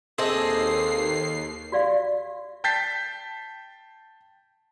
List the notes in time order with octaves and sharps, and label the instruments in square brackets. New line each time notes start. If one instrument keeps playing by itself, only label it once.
[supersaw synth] D#2 C7 [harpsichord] C4 D4 [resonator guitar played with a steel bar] G#4 A4 D#5
[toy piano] F#4 G4 D5 E5 F5
[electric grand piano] G5 A5 G6 A6 B6 C7